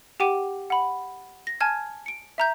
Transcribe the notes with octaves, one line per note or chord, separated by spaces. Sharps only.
G4 F#5 G5 D6 D#7
F#5 B5
A#6
G#5 A5 F6 G#6
C#7 D7
E5 A#5 G6